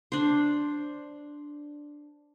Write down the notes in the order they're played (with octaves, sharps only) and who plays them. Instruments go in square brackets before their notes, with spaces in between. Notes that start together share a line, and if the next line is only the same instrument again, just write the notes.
[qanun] D4 C5